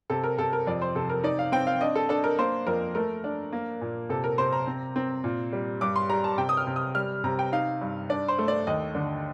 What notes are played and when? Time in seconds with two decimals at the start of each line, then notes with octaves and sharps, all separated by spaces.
0.10 C3 A4
0.24 A#4
0.38 C3 A4
0.53 A#4
0.67 F2 D5
0.82 C5
0.95 C3 A4
1.10 A#4
1.24 D#4 D5
1.39 F5
1.52 C4 G5
1.67 F5
1.81 D4 D#5
1.95 A4
2.09 D4 A4
2.24 A#4
2.39 A#3 C5
2.67 F2 A#4
2.95 A3 A#4
3.24 D4
3.53 A#3
3.81 A#2
4.09 C3 A4
4.24 A#4
4.38 C3 C5
4.53 A#5
4.67 C4
4.96 C4
5.24 A#2
5.53 G3
5.81 G2 D6
5.96 C6
6.09 G3 A#5
6.24 A5
6.38 C3 G5
6.49 D#6
6.57 F6
6.67 C3
6.76 D#6
6.95 G3 F6
7.24 C3 A#5
7.39 G5
7.53 D#4 F5
7.81 G2
8.10 D4 D5
8.28 C5
8.39 A3
8.48 D5
8.67 D#2 D#5
8.95 D3